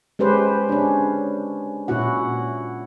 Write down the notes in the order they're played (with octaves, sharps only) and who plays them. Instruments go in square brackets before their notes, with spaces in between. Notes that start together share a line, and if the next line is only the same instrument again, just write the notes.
[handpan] G#3 C#4 G4 B4 C5
C#4 D4
A#2 C#4 E4 F#4 F#5